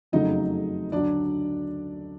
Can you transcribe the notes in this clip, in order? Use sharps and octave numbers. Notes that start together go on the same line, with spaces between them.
F#1 F2 C#3 F#3 A3 D#4 D#5
D2 D3 F#3 D4 D5